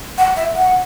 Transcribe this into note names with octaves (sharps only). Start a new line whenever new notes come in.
F#5
E5
F#5